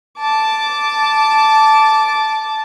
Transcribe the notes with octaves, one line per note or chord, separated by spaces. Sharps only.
A5 D6